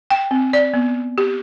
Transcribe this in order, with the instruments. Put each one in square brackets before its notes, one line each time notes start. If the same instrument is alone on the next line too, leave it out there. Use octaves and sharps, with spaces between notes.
[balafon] G5
C4
D5
B3
G4